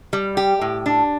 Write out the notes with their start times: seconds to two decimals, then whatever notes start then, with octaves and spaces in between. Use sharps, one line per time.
0.13 G3
0.37 G4
0.61 A2
0.86 D4